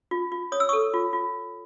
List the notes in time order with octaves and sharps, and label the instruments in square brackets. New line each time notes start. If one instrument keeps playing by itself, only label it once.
[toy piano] F4
F4
C#5 D#6
E6
A4 C#6 D#6
F4
F4